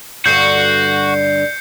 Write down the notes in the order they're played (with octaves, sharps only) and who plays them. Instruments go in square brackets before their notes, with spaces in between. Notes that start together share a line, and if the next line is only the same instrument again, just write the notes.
[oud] G2 D3 [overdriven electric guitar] F#4 [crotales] G6 C7 C#7